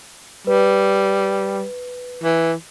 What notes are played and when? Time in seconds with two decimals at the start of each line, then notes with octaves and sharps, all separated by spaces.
0.47 G3 B4
2.24 E3